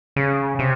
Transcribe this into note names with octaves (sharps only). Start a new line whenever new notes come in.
C#3
C3